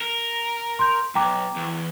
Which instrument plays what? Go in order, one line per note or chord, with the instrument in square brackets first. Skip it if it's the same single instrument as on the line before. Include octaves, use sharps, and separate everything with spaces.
[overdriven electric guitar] A#4
[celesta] C6 G6
[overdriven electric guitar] B1 [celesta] G5 A#5 D6
[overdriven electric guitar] E2